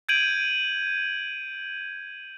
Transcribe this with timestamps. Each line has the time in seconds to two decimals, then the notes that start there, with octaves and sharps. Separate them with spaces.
0.09 G6 G#6 D7 D#7 F#7